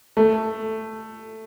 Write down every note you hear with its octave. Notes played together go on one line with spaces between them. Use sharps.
A3